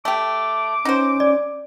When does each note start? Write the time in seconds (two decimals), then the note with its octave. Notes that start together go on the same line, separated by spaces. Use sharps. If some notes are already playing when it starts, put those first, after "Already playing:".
0.05 A3 G4 D6
0.85 C#4 D#4 F#4 C5
1.20 D5